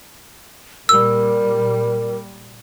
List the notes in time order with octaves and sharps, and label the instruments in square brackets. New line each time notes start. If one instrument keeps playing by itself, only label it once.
[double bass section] A#2 G3 [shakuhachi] A#4 [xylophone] E6